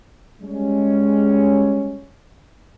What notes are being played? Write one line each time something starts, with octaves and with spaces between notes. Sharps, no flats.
G3 G#3 C#4